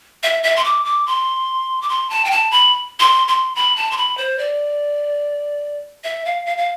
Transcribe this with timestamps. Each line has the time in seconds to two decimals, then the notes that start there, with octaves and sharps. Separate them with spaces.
0.23 E5
0.43 E5
0.56 C6
0.64 D6
0.85 D6
1.06 C6
1.82 D6
1.89 C6
2.10 A5
2.25 G5
2.31 A5
2.51 B5
3.00 C6
3.28 C6
3.55 B5
3.76 A5
3.91 C6
3.97 B5
4.18 C5
4.38 D5
6.04 E5
6.25 F5
6.46 F5
6.58 F5